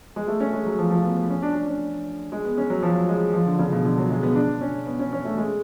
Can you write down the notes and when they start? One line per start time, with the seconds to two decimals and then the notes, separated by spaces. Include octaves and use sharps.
0.16 G#3
0.28 A3
0.40 C#4
0.53 G#3
0.66 F#3
0.79 F3
0.91 F3
1.04 B3
1.17 B3
1.30 C#4
1.42 D4
1.55 D4
1.68 C#4
2.32 G#3
2.45 B3
2.58 C#4
2.70 F#3
2.83 F3
2.95 F#3
3.08 G#3
3.34 F3
3.46 D3
3.59 C#3
3.72 B2
3.85 D3
3.98 F#3
4.10 G#3
4.23 B3
4.35 D4
4.61 C#4
4.86 B3
4.99 C#4
5.13 C#4
5.25 A3
5.38 G#3